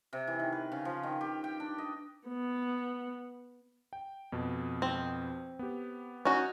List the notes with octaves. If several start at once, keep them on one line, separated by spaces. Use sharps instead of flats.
C3
E3
D#3
B4
C#3
F3
D#3
G4
G5
D4
D#5
B3
G5
F2 B2
C4
B3 G4
C#4 D#4 F#4